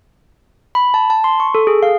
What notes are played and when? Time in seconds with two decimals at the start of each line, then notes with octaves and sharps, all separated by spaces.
0.75 B5
0.94 A5
1.10 A5
1.24 C6
1.40 C#6
1.55 A4
1.67 G#4
1.83 F5